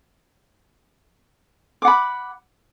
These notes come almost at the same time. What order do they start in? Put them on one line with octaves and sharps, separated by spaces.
D6 F#5 B5